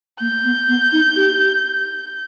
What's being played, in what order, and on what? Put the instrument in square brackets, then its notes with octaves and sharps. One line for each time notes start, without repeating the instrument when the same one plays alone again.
[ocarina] A#3 [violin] G6
[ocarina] B3
B3
D#4
G4